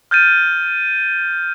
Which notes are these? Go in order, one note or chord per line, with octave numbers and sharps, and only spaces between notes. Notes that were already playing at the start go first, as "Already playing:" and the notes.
F6 G6 A6 D#7